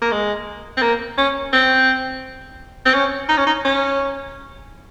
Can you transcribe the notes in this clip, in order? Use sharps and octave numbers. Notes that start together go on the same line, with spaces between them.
A#3
G#3
C4
A#3
C#4
C4
C4
C#4
D#4
C#4
D#4
C#4